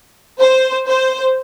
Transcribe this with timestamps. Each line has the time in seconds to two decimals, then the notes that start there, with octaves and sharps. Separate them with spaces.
0.39 C5
0.87 C5